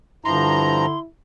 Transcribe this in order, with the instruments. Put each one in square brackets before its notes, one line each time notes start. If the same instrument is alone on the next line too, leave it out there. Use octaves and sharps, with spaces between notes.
[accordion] G2 F3 A#5 [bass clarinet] D3 [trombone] E4 [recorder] C6